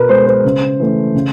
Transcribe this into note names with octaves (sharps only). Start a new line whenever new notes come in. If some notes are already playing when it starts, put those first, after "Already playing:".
Already playing: B2 A#4 B4
G#3 B3 C5
C5
C#3
E3 A3
C#3